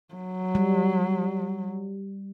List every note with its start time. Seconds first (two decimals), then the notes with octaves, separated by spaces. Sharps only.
0.14 F#3
0.55 G3